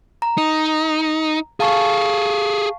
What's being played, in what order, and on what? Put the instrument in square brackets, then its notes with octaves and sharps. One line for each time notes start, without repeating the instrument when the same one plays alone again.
[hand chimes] A#5
[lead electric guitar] D#4
[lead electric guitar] G#4 A4 [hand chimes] F5 A5 C#6